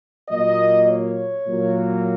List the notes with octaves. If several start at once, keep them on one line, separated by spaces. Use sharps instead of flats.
A#2 F#3 A#3 D#5
C#5
A#2 F#3 A#3